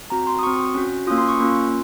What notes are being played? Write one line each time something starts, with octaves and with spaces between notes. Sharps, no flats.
C4 F#4 A#5
C6
D#6
C4 F#4 C#6
C#4 F#4
A#3 C#4 F4 D#6
C6
C#6
A#3 C#4 F4